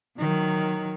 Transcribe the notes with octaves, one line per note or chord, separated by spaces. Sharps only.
D#3 F#3